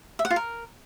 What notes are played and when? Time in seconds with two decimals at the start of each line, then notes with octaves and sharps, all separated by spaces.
0.19 E5
0.25 F#5
0.31 F4
0.36 A#4